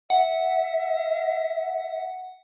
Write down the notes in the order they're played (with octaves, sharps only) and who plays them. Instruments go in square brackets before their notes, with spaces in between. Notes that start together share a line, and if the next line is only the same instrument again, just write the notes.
[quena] E5 [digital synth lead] F#5